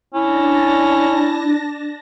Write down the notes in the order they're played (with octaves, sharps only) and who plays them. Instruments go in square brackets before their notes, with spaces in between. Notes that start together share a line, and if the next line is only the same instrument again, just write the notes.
[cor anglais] C#4 [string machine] D4 A5 A#6 [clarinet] E4